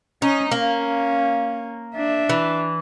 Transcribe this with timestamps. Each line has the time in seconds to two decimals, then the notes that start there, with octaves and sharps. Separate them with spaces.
0.22 C#4 D#4
0.51 A#3 C#4
1.95 D4 E5
2.29 E3